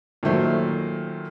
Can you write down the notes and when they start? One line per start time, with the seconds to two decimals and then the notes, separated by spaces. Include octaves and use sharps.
0.23 A#2 D#3 F#3 A3 C5